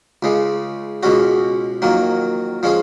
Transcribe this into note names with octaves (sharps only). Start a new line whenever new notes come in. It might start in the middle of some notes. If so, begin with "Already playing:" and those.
C#2 C#3 G#3
C#2 B2 G#3 C#4 F#4
F2 D#3 F#3 A#3
F3 G#3 C#4 G#4